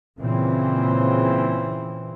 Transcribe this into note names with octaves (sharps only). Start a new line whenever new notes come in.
A#2 C#3 E3 C4